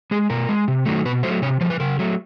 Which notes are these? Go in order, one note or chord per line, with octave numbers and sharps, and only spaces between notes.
G#3 G#4
B2 A#4
G#3
C3
D#3 F#3 A3
B2 B4
F#3 A3 C5
C3 C#5
F3 A3 C5
B4
C#3 A#4
F#3 A3